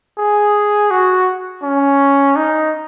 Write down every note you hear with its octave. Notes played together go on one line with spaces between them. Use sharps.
G#4
F#4
C#4
D#4